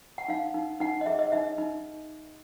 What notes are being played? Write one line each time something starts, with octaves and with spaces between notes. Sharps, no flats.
F#5
D#4 F5
D#4
D#4 F#5
D#5
G#4 E5
D#5
D#4 E5
D#4